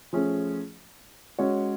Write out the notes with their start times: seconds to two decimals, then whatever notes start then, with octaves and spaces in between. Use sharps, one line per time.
0.13 F3 A3 C#4 G#4
1.38 G#3 C#4 F#4 C#5